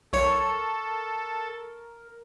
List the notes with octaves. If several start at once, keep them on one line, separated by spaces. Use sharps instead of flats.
B1 A4 A#4 C#5 C#6 C#7